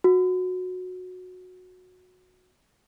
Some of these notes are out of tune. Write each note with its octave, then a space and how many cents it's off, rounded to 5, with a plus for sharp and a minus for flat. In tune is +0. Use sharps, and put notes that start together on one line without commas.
F#4 -15